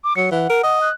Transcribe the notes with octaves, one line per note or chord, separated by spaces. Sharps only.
D6
F#3 C#7
E3 F#5
A#4
D#5
F#6